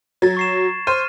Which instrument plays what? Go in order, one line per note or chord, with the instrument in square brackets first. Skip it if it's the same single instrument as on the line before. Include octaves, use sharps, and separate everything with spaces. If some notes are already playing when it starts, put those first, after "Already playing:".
[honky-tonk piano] F#3 [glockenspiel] G#6 A6
[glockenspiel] C#6 C7 E7
[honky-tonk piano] C5 [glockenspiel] F6 D#7